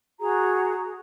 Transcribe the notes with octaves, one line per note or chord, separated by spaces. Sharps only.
F#4 G#4 A#5